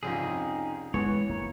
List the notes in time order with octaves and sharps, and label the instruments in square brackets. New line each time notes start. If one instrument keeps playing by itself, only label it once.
[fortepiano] C2 F2 C#3 [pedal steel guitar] D#4 G#4
[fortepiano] E3 B3 [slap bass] G#3 [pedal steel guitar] C#5
[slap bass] A#3